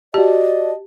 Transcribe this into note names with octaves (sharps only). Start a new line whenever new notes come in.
F#4 G4 D5 D#5 A5